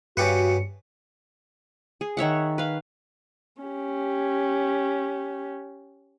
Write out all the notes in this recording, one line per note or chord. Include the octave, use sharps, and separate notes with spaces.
G2 C#3 F#4 G4 B4 C#7
G#4
D#3 C#5 E5 F#5
B4 F5
C#4 G4